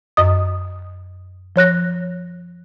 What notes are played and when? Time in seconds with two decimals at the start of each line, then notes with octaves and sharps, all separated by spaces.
0.17 F#2 D#5 D#6
1.56 F3 C#5 F#6 A#6